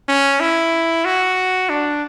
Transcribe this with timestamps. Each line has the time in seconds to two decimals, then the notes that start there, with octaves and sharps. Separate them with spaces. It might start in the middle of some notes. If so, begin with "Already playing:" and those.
0.09 C#4
0.40 E4
1.05 F#4
1.69 D4